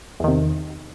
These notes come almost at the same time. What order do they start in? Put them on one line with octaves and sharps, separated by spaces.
E2 D#3 C3